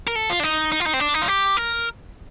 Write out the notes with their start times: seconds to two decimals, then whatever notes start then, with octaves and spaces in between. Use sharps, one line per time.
0.07 A#4
0.16 A4
0.30 F4
0.40 D4
0.43 D#4
0.72 D#4
0.80 F4
0.86 D#4
0.94 C4
1.00 D4
1.14 D#4
1.22 F4
1.28 G4
1.57 A#4